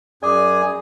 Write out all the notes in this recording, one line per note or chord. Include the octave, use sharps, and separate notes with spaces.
F#2 G#4 D5 G#5 D6